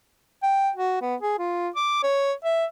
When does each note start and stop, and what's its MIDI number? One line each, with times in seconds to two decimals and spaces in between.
0.43 0.71 79
0.76 0.97 66
1.01 1.16 59
1.22 1.35 68
1.39 1.69 65
1.76 1.98 86
2.03 2.33 73
2.44 2.66 76